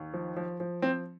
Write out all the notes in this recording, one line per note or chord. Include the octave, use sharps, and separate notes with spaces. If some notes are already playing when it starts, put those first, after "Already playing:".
Already playing: D#2
F3
F3
F3
F3 C4